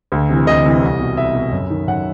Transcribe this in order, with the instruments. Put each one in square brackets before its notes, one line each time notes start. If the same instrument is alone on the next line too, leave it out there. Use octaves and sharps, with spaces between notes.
[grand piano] D2
C3 E3
D2 D#5
C3 E3
C2
B2
C2 E5
B2
F#2
D#3
F#2 F#5